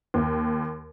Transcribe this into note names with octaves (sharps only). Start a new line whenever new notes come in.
D#2